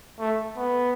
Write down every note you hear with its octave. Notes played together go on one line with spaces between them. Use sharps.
A3
B3